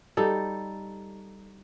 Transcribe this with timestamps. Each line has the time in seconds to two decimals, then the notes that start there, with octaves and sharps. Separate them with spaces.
0.17 G3 D#4 A4